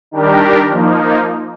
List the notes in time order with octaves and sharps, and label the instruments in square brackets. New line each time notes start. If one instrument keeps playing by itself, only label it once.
[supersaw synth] D#3 G3 D4 G4 A#4
F3 A#3 D#4